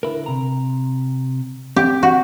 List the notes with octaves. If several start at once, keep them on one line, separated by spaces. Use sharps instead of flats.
D3 E4 A#4
C3 A#5
C4 G4
F#4